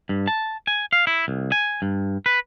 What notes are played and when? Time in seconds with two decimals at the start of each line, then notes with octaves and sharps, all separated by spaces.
0.09 G2
0.28 A5
0.67 G#5
0.93 F5
1.07 E4
1.28 C2
1.52 G#5
1.82 G2
2.26 B4